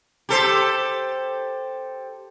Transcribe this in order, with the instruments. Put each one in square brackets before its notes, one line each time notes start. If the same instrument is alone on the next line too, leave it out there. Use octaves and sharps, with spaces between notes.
[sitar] G4 A4 C5